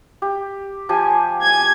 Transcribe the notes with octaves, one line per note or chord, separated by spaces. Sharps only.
G4
F3 G4 G#5
G#5 G#6